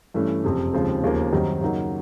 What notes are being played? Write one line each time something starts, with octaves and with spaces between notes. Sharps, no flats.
G2 E3 A3 C#4
F#1 F2 C3
D#2 C#3 F3 G#3 C4
E1 D#2 C#3 F3 A#3
F#2 D#3 G3 C4 D#4
F#2 C#3 F#3 A#3 D#4